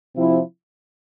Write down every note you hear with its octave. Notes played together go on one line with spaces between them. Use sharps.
C3 F3 C4 E4